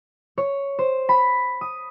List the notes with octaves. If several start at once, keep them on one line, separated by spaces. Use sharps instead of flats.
C#5
C5
B5
D#6